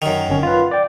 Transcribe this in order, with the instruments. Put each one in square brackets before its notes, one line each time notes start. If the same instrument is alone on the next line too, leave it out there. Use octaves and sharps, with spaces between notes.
[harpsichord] F#2 D#3
[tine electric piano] G1 C#4
F4 B4
D5 G5